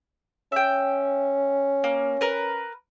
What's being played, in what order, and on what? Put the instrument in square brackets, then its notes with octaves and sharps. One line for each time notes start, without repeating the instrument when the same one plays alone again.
[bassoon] C#4 [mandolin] E5 G5
[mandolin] A#3
A#4 B4